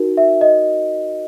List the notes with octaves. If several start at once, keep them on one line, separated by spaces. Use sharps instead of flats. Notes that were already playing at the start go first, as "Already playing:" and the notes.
Already playing: D#4 F#4 A#4
E5
D#5